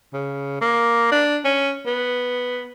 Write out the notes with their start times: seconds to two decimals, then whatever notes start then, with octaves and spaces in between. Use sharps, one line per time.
0.13 C#3
0.61 A#3
1.12 D4
1.45 C#4
1.86 B3